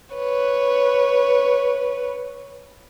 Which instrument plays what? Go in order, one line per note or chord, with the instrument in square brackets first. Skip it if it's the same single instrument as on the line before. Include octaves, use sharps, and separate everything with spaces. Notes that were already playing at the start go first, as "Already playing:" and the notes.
[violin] B4 C#5